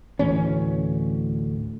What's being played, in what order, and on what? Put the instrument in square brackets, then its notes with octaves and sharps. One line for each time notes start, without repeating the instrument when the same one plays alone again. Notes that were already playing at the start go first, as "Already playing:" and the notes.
[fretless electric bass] D2 A2 E3 C#4